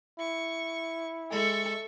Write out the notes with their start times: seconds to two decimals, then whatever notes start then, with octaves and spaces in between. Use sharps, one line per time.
0.19 E4 C#6
1.32 G#3 A4 E5 C#6